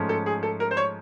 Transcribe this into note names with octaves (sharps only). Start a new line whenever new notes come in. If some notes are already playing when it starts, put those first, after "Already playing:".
Already playing: G#2 F3 A3 C#4
A4
G#4
A4
A#4
C5
C#5